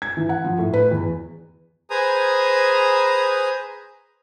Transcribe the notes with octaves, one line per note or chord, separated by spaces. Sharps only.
G#6
E3
F#5
F3
A2
B4
E2
G#4 B4 C5 G#5 A#5 D#6